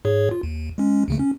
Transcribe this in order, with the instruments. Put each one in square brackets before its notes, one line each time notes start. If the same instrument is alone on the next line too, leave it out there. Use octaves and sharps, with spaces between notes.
[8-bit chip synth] G#2 G#4 C#5
F4
D#2
G#3 C#4
D2 C#3 A3
C#4